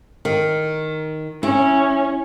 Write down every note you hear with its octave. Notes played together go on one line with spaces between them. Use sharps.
D#3
C#4 E4